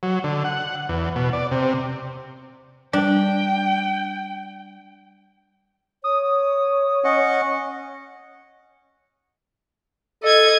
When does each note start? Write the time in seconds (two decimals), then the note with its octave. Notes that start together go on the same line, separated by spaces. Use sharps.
0.03 F#3
0.24 D3
0.44 F#5
0.89 E2
1.16 B2
1.33 D5
1.52 C3
2.93 G3 D4 G5
6.04 C#5 D#6
7.04 C#4 D#5 F#5
10.24 A4 D#5 G#6